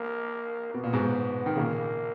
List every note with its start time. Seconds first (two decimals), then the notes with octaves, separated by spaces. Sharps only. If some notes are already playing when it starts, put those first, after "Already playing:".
Already playing: A#3
0.74 B2 B3
0.83 A#2
0.93 G#2 B2
1.46 D#3
1.56 A#2 C#3 A#3